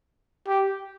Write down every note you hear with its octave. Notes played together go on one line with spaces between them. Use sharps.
G4